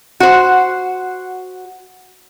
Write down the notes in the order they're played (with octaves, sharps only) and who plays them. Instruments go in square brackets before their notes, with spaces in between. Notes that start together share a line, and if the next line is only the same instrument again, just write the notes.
[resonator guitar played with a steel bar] F#4 C5